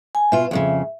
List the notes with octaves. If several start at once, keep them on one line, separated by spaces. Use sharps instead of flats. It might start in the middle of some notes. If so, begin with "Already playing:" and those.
G#5
B2 F4 E5
F2 A2 C#3